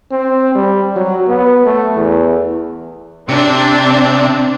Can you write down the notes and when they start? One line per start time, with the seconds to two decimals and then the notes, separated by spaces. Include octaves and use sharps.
0.12 C4
0.55 G3
0.96 F#3
1.28 B3
1.66 A3
1.96 E2
3.29 C3 C4 D4